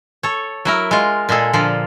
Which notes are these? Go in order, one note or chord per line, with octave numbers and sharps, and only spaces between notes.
A4 C#5
F#3 E4 A#4
G#3 F4
A#2 G#3 G#4 A4
A#2 D3 F3 F4